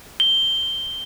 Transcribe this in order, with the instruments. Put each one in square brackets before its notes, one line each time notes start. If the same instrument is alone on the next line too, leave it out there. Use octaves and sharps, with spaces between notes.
[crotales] G7